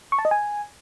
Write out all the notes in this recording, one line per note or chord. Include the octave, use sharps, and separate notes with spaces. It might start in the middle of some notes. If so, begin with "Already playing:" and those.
C#6
A5
D#5
G#5